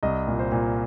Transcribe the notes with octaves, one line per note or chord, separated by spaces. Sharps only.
C2 D#5
A#2
C5
A#2